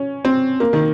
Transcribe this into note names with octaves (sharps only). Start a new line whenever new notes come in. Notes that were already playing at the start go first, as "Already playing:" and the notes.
Already playing: C#4
C4
A#3
D#3